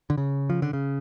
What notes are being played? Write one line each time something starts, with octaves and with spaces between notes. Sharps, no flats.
D3
C#3
F3
D3
C#3